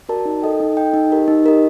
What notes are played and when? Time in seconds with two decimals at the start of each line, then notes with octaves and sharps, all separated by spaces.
0.09 F#4 A#4 D5 A5
0.25 D#4
0.43 A4 D#5 G5
0.60 D#4
0.77 A4 D#5 G5
0.94 D#4
1.10 G4 A#4 D#5
1.28 D#4
1.44 G4 A#4 D#5